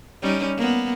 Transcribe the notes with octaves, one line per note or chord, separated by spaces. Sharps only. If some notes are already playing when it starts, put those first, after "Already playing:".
G3 C#4 D#4
A#3 B3